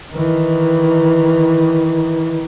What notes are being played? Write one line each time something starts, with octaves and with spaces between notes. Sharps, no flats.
D#3 E3